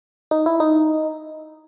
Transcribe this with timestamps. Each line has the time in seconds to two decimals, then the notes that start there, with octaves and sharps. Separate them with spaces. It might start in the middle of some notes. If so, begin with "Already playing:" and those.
0.31 D#4
0.46 E4
0.60 D#4